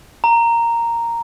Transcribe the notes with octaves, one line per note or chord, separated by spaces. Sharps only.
A#5